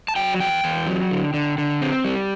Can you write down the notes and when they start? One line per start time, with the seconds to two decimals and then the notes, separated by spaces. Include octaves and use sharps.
0.08 A5
0.16 F#3 G5
0.40 E2 G5
0.64 E2
0.87 F#3
1.11 D3
1.34 D3
1.58 D3
1.81 C4
2.04 G3